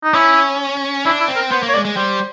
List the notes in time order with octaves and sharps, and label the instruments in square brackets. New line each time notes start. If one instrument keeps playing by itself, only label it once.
[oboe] D#4
[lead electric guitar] C#4 [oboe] E4
[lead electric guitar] D4 [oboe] E4
[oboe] E4
[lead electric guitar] C4
[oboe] A#4
[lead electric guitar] B3 [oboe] C5
[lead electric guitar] A#3
[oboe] C#5
[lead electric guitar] G#3 [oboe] D5
[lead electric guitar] G#3
[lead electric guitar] G3 [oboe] C5